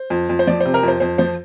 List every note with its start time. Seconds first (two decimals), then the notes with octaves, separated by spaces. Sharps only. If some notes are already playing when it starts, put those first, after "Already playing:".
Already playing: C5
0.10 F2
0.29 F2
0.39 C5
0.47 F3 D5
0.60 C3 C5
0.74 A#4
0.83 F2 C5
1.00 F2 C5
1.18 F3 C5